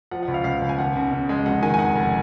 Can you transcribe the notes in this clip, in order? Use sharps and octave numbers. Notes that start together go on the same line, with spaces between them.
F3 F#5
F#5
C#2
F5
C#2 F5
C#2
G#5
D#2 F#5
C#3
C#3
G#3
F1 F#5
D#3 G#5
G#5
F1 F#5
F1